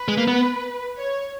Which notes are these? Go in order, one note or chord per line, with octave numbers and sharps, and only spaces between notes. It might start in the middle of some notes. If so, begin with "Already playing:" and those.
Already playing: B4
G#3
A#3
B3
C#5